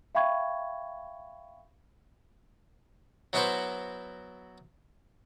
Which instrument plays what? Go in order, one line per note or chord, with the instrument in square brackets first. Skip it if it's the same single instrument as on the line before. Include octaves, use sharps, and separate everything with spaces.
[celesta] E5 F5 G5 B5 C#6 G#6
[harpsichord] F#3 B3 E4 F#4 B4 C5